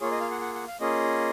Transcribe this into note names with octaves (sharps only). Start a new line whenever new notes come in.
A#3 F4 G#4 C#5
D#5
F5
F#5
F#5
F#5
F5
A#3 C#4 F4 G#4 D#5